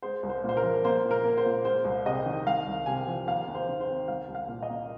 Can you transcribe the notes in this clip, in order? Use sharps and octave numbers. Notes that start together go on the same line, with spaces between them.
G#3 C5
C2
C5
A#2
C5
A#4
F3
A#3 C5
A#2
A#4
A#3
C5
A#2
G#3 C5
C2
C3 D#5
D#3
C2 F5
C2
C3 G#5
F3
D#2 F5
D#2
C5
D#3
C5
C4
C2 F5
C2
F5
A#2
D#5
A#3